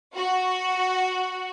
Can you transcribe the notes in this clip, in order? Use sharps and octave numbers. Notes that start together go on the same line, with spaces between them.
F#4